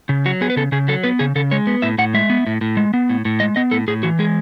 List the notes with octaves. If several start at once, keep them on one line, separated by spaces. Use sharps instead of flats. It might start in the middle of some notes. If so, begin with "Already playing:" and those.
C#3
F#3 F#4
B3 G#4
B4
C#3 A4
C#3 G#4
F#3 A4
B3 B4
C#3 G#4
C#3 A4
G#3 C#5
B3
A2 E5
A2 F#5
G#3 E5
B3
A2
A2
G#3
B3
A2
A2
G#3 D#5
B3 D#5
A2 A4
A2 G#4
E3 F#4
G#3 G#4